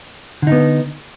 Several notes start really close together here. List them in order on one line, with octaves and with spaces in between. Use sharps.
D3 D#4 B3